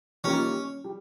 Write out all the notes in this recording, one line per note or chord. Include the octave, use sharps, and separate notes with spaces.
D#3 G3 A#3 C#4 F4
G3